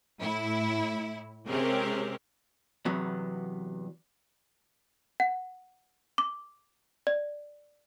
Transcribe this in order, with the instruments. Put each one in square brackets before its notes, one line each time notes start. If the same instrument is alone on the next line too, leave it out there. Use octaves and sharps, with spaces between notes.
[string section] A2 E4
C3 G#3 C4 C#4 G4 A#4
[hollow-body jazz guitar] E2 C3 F#3 B3
[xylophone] F#5
D6
D5